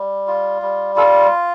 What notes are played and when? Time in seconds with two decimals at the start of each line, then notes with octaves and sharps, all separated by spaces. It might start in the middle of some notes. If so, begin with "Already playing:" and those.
Already playing: G3
0.27 F4
0.62 G3
0.96 F4 A4